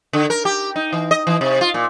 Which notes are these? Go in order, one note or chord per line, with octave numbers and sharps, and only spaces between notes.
D3
A#4
G4
D#4
E3
D#5
E3
C3
F4
A#2